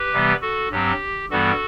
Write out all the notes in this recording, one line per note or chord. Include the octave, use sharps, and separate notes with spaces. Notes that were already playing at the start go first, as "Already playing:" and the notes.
Already playing: G4 B4
C3 E3 G3 B3
F#4 A4
G2 F#3 C4 G4
G2 E3 G3 B3 F#4 A4